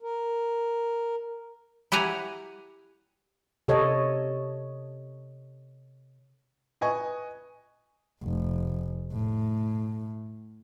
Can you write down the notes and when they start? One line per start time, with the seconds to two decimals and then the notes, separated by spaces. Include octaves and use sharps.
0.02 A#4
1.92 E4 G4 F#5 G#5 A#5
3.68 C3 A4 C#5 D#5
6.81 B4 D#5 G#5 C#6
8.22 F1
9.12 A2